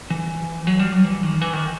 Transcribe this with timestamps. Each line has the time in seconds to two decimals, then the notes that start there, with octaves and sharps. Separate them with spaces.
0.10 E3
0.67 F#3
0.79 G3
0.92 F#3
1.04 E3
1.23 D#3
1.41 E3
1.53 D#3